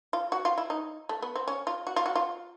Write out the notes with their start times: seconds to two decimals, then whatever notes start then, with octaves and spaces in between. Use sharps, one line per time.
0.13 F4
0.32 F#4
0.45 F4
0.58 E4
0.70 D#4
1.09 A3
1.22 B3
1.36 C4
1.48 C#4
1.67 F4
1.87 F#4
1.96 F4
2.06 F#4
2.15 F4